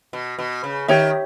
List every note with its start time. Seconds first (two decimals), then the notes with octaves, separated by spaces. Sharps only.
0.13 B2
0.39 B2
0.64 C#3
0.88 D#3 G4 C#5 E5